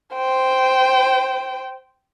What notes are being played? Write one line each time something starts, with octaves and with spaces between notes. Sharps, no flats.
C5 G5